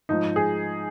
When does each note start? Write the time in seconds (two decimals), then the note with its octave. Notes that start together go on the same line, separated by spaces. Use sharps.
0.09 G#2 F3 D#4
0.36 G#4